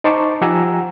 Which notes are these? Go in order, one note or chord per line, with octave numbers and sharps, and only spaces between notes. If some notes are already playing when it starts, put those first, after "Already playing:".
D#4 C5 A5 C#6 D6
F3 G4 F#5 G#5 A#5 E6